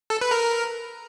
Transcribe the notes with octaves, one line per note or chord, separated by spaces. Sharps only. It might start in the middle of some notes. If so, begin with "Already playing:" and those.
A4
B4
A#4